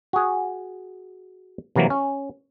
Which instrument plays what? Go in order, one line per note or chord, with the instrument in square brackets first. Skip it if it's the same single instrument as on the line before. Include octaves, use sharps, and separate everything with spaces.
[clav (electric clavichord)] F#4 G#4
C3 E3 F#3 A#3
C#4